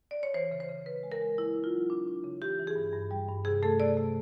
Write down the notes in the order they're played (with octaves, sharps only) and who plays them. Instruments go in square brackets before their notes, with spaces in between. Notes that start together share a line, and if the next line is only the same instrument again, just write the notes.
[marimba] D5
C#5
E3 C5
C#3
C5
C#3
C#3 B4
G#3
A#4
G#3
A#3 E4
D4
F4
F#3
D4
D4
C#3
E3 G4
E3
G#4
G2
G2
G3
G2
C3 G#4
A3 A4
C3 D5
A3